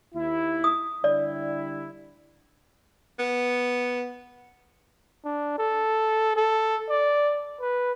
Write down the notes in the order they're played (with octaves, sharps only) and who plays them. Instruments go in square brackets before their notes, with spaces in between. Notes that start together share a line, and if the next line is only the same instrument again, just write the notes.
[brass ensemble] D#2 E4
[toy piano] D#6
[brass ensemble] D3 G3 E4 [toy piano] D5
[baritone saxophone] B3
[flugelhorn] D4
A4
A4
D5
B4